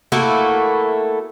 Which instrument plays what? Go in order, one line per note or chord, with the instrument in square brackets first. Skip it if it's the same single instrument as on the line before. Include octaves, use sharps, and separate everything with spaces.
[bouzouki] A3 A#3 E4 F#4